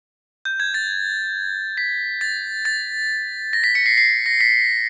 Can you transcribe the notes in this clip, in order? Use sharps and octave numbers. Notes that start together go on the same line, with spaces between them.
G6
G#6
A6
B6
A6
A6
A#6
B6
C#7
C7
C7
A#6
B6